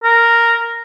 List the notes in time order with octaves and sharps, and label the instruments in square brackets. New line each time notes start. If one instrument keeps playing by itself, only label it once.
[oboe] A#4